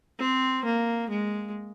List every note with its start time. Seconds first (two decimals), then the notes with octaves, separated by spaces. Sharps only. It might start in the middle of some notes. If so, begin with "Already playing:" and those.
0.19 C4
0.65 A#3
1.09 G#3